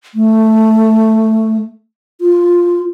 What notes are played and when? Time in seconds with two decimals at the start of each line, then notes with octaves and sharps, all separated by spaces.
0.15 A3
2.21 F4